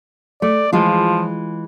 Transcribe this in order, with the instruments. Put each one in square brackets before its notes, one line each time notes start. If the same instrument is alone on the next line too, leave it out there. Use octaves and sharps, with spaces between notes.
[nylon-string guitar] A3 [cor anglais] D5
[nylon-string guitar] E3 G#3 F4 [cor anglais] F3